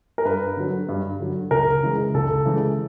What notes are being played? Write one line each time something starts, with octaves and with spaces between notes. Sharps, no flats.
A#4
G2 B4
D3 F#3
G2
D3 F#3
C#2 A#4
C#3 E3 G#3
C#2 A4
C#3 E3 G#3